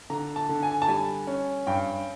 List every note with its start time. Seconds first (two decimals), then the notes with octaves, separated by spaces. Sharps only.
0.10 D3 A#5
0.36 A5
0.49 D3
0.63 G#5
0.82 A5
0.88 G3 G#5
1.27 C#4
1.67 G2 G5